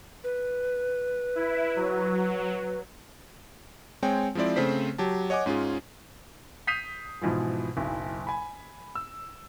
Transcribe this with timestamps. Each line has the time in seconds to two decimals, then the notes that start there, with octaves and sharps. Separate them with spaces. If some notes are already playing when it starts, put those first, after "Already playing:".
0.24 B4
1.35 E4
1.76 F#3
4.02 G#3 C4 C#5 G5 G#5
4.35 F3 G#3 C4 E4 D5
4.56 C#3 A3 C4 C5 B6
4.98 F#3 G4 A5
5.30 C#5 D#5 F#5 G#5 D6
5.46 G#2 C#4 F4 G#4
6.67 D#6 G6 B6 C7 D#7 F7
7.22 G#2 B2 E3 F3
7.77 F#1 B1 E4
8.27 G#5 B5
8.95 E6